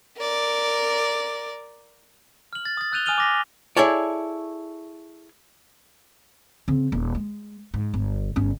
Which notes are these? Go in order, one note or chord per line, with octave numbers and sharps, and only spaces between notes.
A#4 D5
F6 F#7
A6
D#6 A6
E6 F#6 G6 D#7 F7 G7
G#5 D#6 F6 D#7 F7 G7
D6 A#6 B6
E4 G#4 A4 C#5 D5
C#3 C4
D#1
G#3
G#2
G1
G1 C#4